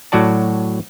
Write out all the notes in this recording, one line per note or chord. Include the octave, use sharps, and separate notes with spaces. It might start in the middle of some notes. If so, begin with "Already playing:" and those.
A2 F#3 F#4 D5 A5